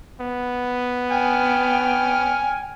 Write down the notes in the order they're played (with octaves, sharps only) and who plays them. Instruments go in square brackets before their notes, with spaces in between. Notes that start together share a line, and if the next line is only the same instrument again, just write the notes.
[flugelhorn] B3
[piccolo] G5 [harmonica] G#5 F6